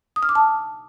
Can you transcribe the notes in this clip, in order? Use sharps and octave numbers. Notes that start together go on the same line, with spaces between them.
D#6
F6
D6
A5